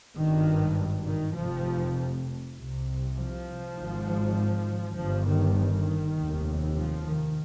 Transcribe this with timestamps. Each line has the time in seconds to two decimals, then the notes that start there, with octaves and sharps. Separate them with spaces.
0.16 G#1 G2 D#3
1.06 D#3
1.35 F1 F2 C3 F3
2.56 C2 C3
3.16 F3
3.76 G#1 G#2
4.96 G1 G2 F3
5.26 D#3
5.57 D#3
6.16 F1 D#2
6.77 F3
7.07 D#3